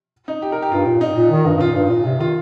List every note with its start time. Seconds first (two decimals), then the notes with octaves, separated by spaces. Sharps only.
0.28 D#4
0.42 G4
0.52 A#4
0.62 G4
0.72 G2 F4
0.86 A#2
1.01 D#4
1.16 A#2
1.31 D#3
1.46 G2
1.57 G2
1.61 A#2 F4
1.76 G2
1.90 A#2
2.05 C3
2.20 D#3 F4